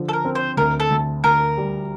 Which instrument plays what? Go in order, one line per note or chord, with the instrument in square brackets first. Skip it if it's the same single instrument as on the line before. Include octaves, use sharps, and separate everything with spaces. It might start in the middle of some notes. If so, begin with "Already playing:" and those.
Already playing: [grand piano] D3 F3
[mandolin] A4
A#4
[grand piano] C4
[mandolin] C5
[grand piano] D2 [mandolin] A#4
[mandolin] A4
[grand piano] D2
[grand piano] D2 [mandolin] A#4
[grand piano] G3